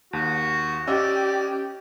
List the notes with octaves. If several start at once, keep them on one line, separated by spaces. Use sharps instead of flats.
D#2 F#4
C#4 G4 D5 D#5 E6